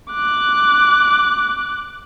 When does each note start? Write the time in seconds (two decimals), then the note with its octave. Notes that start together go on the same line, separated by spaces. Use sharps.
0.12 D6 F#6